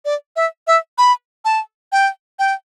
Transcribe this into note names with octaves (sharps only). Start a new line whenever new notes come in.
D5
E5
E5
B5
A5
G5
G5